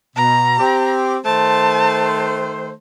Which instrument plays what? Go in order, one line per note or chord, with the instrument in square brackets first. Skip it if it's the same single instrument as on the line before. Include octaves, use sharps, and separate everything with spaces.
[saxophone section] B2 [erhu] A#5
[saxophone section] C4 G4
[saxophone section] D#3 A3 C5 [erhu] A5